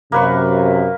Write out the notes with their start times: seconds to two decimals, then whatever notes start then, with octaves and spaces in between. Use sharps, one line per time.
0.12 F#2 C3 A#3 B4 C#6